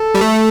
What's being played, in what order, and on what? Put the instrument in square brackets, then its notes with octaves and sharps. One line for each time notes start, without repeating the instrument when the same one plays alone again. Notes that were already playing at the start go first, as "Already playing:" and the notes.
Already playing: [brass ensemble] A4
[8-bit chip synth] G3
A3